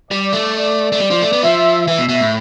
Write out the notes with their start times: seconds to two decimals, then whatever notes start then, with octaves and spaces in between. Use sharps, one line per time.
0.11 G3 D5
0.33 A3
0.55 D5
0.92 A3
1.00 G3
1.11 F3
1.22 A3
1.33 B3
1.43 F3 E5
1.87 E3 E5
1.98 B2
2.09 B2
2.20 A2